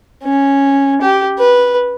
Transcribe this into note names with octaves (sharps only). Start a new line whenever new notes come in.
C#4
G4
B4